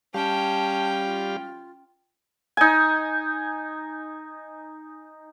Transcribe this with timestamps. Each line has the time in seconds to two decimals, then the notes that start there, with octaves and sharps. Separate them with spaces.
0.14 G3 C#4 G4 F5 G5 A5
1.05 F4
2.57 D#4 G#5